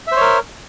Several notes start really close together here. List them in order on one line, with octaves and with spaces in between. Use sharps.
E5 C5 C#5 A#4